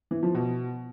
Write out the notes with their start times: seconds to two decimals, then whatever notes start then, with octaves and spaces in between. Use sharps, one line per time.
0.11 E3
0.23 F3
0.35 B2